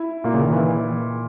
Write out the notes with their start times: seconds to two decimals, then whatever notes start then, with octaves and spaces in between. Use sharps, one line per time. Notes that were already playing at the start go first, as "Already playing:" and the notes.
Already playing: E4
0.24 A#2 A#3
0.34 C#3
0.43 D#3
0.52 E3